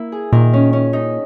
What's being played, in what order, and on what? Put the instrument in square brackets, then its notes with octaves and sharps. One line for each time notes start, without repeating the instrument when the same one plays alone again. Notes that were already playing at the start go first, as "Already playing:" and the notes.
Already playing: [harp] A#3 E4
G#4
[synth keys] A#2 [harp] D#3
[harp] C#4
C#4
D#4